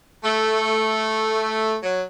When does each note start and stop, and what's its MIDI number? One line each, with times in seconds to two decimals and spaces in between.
0.24 1.77 57
1.83 2.02 54